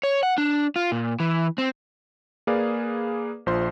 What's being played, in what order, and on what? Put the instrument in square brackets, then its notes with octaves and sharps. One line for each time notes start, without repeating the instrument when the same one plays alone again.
[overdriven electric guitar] C#5
F#5
D4
F4
A#2
E3
C4
[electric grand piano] A#3 G#4 B4 D5 F5
A#1 F3 C5 C6